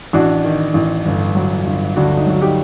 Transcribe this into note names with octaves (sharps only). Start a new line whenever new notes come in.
A1 D4 F#4
D#3
A1
G1
F#3
G1
D2 D4 F#4
D#4
F#3 F#4
D#4 G4